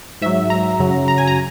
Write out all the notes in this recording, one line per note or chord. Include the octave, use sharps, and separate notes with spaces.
G#2 F#3 E5
A#5
F#2 C#3 F#3
A#5
G#5
A#5